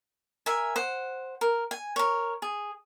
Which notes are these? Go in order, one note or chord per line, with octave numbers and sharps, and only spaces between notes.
A#4 E5 G#5
C5 F#5
A#4
G#5
A#4 C#5
G#4